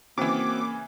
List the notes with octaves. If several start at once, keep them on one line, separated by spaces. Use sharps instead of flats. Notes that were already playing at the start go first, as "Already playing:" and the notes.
C#3 E3 A#3 C4 F#4 D6